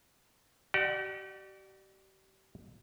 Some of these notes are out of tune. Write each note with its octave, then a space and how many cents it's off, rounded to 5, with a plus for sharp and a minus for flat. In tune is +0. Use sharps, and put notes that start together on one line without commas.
G4 -40 D5 +30 F#5 +0